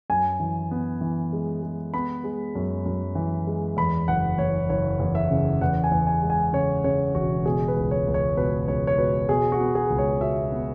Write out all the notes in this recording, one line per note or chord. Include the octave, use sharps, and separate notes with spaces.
F#2 G#5
E3
B3
E3
G#3
G#3
B3 B5
G#3
F#2
F#2
E3
G#3
E2 B5
F#1 F#5
E2 C#5
F#1 C#5
E2
E5
C#3
E2 F#5
G#5
E2
G#5
G#3
G#5
C#3 C#5
C#3 C#5
E1 F#4
B2 G#4
B4
C#2
C#5
C#2
C#5
B2 B4
C#2 C#5
C#5
B2 B4
B2 G#4
F#4
B3
G#4
C#2
C#5
B2 E5
B3